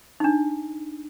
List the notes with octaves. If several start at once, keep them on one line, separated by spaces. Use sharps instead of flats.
D4 D#4